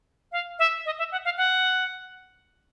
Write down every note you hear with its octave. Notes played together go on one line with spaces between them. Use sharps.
F5
E5
D#5
E5
F#5
F5
F#5